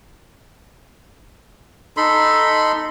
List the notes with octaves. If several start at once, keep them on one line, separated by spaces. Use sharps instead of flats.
D#4 A4 B5 C6